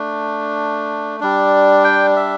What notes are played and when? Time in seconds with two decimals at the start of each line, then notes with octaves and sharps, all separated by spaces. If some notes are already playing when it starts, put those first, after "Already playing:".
Already playing: A3 D4
1.20 G3 D4
1.84 G5
2.16 E5